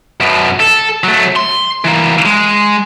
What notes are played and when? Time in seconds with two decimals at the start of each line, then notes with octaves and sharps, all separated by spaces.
0.21 F#2 B2
0.60 A4
1.04 F#3 A3
1.36 C6
1.84 E3 A#3
2.25 G#3